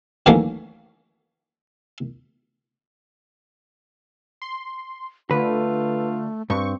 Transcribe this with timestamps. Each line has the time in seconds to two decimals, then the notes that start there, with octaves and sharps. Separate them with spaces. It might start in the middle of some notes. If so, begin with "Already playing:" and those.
0.26 D#3 E3 F#3 A3 A#3 C#4
4.42 C6
5.31 D3 A3 F4 B4
6.50 G2 C4 C#6